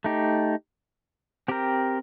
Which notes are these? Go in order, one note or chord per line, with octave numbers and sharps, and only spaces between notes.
A3 D#4 G4
C4 G4 A#4